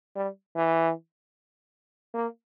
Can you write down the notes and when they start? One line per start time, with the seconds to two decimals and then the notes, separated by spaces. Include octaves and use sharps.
0.16 G3
0.55 E3
2.14 A#3